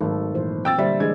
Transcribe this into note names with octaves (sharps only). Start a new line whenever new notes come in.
G#1 F#3 A3 A4
A#2 E3 C5
G5 E6 A6
D3 G3 A#3 C5 E5
E3 G#3 D4 D5 G#6